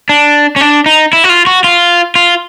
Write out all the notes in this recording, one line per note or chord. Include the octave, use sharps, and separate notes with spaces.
D4
C#4
D4
D#4
E4
F#4
F4
F#4
F4
F4